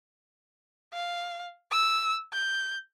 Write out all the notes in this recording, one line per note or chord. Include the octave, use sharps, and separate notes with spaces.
F5
E6
G6